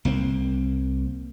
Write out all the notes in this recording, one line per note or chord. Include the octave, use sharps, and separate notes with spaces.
C2 A#3 C4